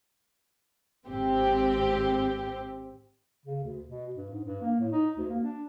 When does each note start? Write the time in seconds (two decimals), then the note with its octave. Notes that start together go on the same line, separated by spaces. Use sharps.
1.06 G#1 C4 G4
3.45 C#3
3.64 D2
3.88 B2
4.16 G2
4.30 G#2
4.45 G2
4.62 A#3
4.80 A2
4.92 D#4
5.18 D2
5.30 A#3
5.43 D4